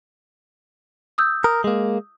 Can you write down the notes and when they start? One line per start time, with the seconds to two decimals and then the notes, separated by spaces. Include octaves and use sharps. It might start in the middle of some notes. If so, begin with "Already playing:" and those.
1.18 D#6 E6 G6
1.44 A#4 D#6
1.64 G#3 A#3